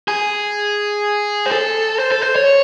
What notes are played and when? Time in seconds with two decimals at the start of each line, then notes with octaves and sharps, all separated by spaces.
0.08 G#4
1.46 C5
1.51 A4
1.99 C5
2.12 A4
2.23 C5
2.36 C#5